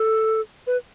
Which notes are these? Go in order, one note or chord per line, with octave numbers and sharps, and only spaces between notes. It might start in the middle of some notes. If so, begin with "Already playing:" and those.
Already playing: A4
B4